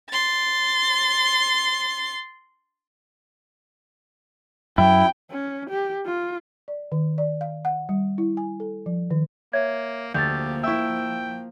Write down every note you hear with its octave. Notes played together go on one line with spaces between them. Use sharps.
C6 A6
F#2 F#3 E4 G5
C#4
G4
F4
D5
D#3
D5
F5
F#5
G3
E4
G#5
A4
F3
D#3
A#3 C#5 E5 G#6
D2 F3 A#3 G4 G6 A6
E4 E5 G5 C#6 E6